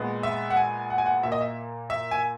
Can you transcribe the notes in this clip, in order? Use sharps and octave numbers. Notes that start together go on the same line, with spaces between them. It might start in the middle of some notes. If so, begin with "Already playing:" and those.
Already playing: A#2 G#3 B3
E5
F#5
G#5
F#5
G#5
F#5
A#2 A#3 E5
D#5
E5
E5
G#5